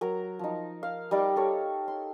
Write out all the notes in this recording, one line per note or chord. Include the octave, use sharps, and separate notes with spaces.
F#3 A#4 A#5
F3 D#4
F5
G3 D#4 D5 G5
A4 C#5
C6